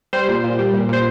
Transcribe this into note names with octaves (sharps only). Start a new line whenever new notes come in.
G3 C5
A#2
A#2
G3
A#2
A#2 C5